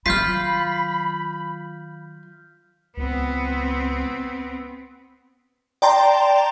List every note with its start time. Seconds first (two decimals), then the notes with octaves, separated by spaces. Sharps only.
0.06 D#3 F#3 F4 B5 F6 G6 B6
2.97 C#2 B3 C4
5.82 D5 G5 A5 A#5 C6